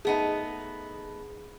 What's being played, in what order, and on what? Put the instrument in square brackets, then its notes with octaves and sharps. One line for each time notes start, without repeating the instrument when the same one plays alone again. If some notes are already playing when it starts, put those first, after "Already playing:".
[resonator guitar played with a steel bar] A3 B3 D#4 [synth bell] G#4